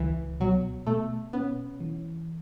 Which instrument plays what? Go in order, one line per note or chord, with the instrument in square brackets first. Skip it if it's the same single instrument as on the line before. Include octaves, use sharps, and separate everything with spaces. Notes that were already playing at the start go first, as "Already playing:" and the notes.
Already playing: [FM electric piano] C#2 [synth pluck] E3
[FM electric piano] B2 [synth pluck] F#3
[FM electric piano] B2 [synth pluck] A3
[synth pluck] B3 [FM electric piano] C#4
[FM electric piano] E3